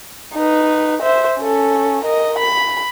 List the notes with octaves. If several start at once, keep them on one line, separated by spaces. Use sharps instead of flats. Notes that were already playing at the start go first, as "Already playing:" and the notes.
D#4 B4
C5 E5
C#4 A4
A#4 D#5
B5